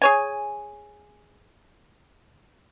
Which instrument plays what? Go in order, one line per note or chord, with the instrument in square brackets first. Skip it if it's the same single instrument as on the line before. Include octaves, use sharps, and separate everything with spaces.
[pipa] G#4 C#5 G#5